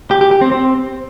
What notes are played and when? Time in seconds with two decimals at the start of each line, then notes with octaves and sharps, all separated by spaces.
0.11 G4
0.21 G4
0.31 G4
0.41 C4
0.52 C4